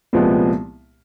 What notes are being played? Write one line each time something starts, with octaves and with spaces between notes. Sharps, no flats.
C2 A#2 F3 G#3 B3